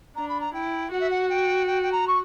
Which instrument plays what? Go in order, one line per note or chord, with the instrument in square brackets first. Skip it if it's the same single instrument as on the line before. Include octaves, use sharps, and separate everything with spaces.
[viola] D4 [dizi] A#5
[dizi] B5
A#5
[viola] E4 [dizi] G5
[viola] F#4 [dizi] F#5
[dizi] E5
F#5
G5
G5
G5
A#5
C#6